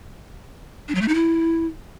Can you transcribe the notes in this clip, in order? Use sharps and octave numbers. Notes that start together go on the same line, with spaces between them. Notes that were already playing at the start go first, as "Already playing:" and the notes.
D4
F#3
A3
D#4
E4